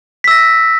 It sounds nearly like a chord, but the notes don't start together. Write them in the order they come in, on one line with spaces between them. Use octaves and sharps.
B6 E6 A#6